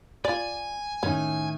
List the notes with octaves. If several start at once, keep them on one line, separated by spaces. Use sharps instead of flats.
F4 D5 G#5
A2 D#3 C#4 D#4